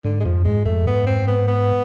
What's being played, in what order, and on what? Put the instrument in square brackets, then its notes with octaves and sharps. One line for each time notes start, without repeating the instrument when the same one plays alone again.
[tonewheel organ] G#2 [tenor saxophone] D3
[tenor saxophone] G#3
[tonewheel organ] F2 [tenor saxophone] F3
[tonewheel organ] G#2 [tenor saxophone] G#3
[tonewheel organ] F2 [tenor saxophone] A3
[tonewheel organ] G#2 [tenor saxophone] B3
[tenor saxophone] C4
B3
B3